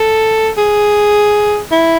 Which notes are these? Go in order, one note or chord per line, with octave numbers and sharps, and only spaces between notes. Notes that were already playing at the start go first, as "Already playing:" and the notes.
Already playing: A4
G#4
E4